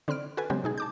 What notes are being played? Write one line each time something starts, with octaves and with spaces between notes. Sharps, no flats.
D3 C4 B5 F6 D7
F#4 A4 B4 G#5
C#3 F#3 G#3 B3 C4 G4
B2 D#4 G#4
A5 D6 G6